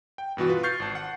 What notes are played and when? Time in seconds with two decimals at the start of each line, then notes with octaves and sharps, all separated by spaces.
0.18 G5
0.37 G2 B2 E3 F#4
0.49 F4 B4
0.63 C#6 F6 G6 A6 C7
0.80 G#1 A5
0.95 F#5